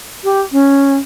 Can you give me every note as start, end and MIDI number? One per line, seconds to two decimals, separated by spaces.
0.24 0.41 67
0.52 0.96 61